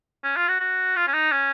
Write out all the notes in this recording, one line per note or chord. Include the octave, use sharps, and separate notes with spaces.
C#4
F4
F#4
F#4
F4
C#4
D#4
C#4